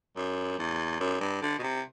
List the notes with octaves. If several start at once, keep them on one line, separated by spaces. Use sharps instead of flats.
F#2
E2
F#2
G2
D3
B2
C3